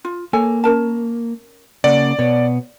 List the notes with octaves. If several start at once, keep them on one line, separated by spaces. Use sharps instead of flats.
F4
A#3 A4 C#5 G#5
C#4 A#4 A5
C#3 A#3 D5 F#5
B2 B3 C#5